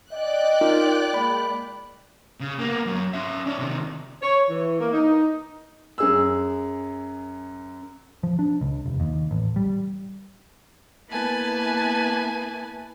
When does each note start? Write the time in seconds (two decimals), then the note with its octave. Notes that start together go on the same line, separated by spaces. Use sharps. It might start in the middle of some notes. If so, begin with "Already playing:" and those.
0.12 D5 D#5 G5 F#6
0.61 D#4 F4 A#4
1.14 G#3 A#3 B5
2.40 C#3
2.59 A#3 B3
2.86 F#2 F#3
3.14 C#4 E5
3.46 C#4 D5
3.59 C3 D#3
4.22 C#5
4.49 E3
4.80 A#3
4.93 D#4
5.98 F#2 G#4 E6
8.23 F3
8.39 D4
8.61 C#2
8.86 F1
9.00 D#2
9.31 A1
9.56 G3
11.10 A#3 B3 E4 B4 G#5 A5